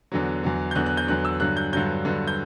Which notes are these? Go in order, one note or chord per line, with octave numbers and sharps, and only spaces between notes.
E2 D3 F#3
E2 D3 F#3
G6
E2 D3 F#3 F#6
F#6
G6
E2 D3 F#3 F#6
E6
G2 D3 F#3 F#6
G6
G2 D3 F#3 G6
G2 D3 F#3
G6